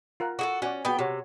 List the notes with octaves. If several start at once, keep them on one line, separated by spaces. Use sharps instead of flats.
F4 A#4 F#5
F#4 G#4 A4
C#4 F#4 D5
B3 F#4 G#4 B4 G5
C3 F#4 C#5